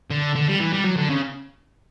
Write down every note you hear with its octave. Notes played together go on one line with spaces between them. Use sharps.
D3
D3
G3
E3
G3
F#3
D3
C#3